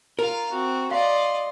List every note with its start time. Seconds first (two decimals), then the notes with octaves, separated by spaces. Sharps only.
0.19 F4 A#4 F5
0.51 C4 F#4
0.91 D5 D#5 F5 C6